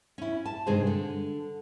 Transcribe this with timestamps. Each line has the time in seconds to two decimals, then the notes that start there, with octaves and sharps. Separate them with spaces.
0.18 C#4 E4
0.46 A5
0.66 G2 C3 D#3 G#3 G#4 C5
0.87 D3